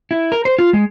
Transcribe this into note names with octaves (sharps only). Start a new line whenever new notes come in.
E4
A#4
C5
F4
G#3